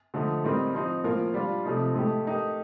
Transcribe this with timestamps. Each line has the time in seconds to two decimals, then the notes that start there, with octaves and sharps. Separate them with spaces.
0.14 D3 F3 A3 D#4
0.44 A2 G3 C4 D#4 A#4
0.74 F3 C4 D#4
1.04 A2 F3 A#3 F4 A#4
1.34 G3 D4 F4
1.65 C3 F3 A3 D#4
1.95 A2 A3 D#4 G4
2.25 A3 D#4 G4 A#4